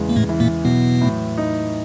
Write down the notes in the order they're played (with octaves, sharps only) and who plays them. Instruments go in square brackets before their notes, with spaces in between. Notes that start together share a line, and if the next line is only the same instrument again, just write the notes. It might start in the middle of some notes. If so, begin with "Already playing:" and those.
Already playing: [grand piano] E2 C#3 G#3
[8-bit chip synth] A#3
A2 A3
[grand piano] E3
[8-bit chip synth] A#2 A#3
[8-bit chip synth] B2 B3 [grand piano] F#3
[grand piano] A2
D#4